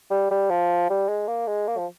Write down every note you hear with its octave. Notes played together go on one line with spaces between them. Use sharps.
G3
G3
F3
G3
G#3
A#3
G#3
A#3
F3